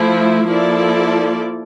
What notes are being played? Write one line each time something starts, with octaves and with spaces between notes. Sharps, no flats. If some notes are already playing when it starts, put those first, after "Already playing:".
Already playing: F3 A3 E4
F3 A#3 E4 A4 D5